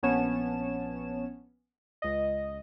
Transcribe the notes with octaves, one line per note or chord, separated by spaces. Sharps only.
A#1 B3 C#4 C#5 A5 E7
C#2 D#5